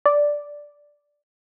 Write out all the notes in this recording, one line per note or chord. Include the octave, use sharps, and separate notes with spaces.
D5